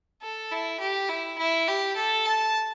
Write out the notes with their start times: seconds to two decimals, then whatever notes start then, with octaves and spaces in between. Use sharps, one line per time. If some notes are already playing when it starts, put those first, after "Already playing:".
0.22 A4
0.51 E4
0.80 G4
1.09 E4
1.38 E4
1.68 G4
1.96 A4
2.25 A5